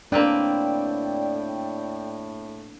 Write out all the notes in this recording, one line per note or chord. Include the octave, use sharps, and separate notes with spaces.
A2 A#3 C4 D4 B4 D5 G5